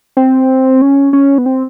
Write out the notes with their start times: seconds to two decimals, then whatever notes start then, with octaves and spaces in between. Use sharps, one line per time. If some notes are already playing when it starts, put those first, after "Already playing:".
0.17 C4
0.81 C#4
1.13 C#4
1.38 B3
1.46 C4